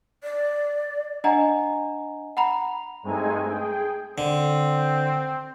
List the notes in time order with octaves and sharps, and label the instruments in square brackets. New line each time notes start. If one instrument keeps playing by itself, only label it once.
[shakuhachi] D5
[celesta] D4 D#5 F#5 G#5 A#5
F#5 A#5 B5 F7
[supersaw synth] G2 G#3 A3 C4 D#4 G#5
G#4 G5
[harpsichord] D3 [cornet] C4